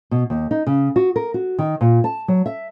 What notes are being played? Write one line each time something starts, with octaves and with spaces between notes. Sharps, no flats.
B2
D#2
D#4
C#3
F#4
A#4
F#4
D#3
A#2
A5
F#3
E5